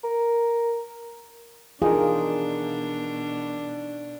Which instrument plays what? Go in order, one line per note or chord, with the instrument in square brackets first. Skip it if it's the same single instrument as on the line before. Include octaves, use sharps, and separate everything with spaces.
[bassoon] A#4
[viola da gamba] B2 D4 [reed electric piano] E3 D#4 A#4 [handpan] F4 G#4